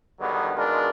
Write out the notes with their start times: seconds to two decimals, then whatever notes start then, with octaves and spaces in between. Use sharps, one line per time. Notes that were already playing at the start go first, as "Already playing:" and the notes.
0.20 E2 G2 D3 D#3 F#3 B3
0.56 B2 D#3 G#3 D4 F4 A#4